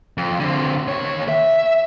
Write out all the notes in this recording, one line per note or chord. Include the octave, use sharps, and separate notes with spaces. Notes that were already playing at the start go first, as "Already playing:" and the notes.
F2
D3 C4
D#2 C#5
E5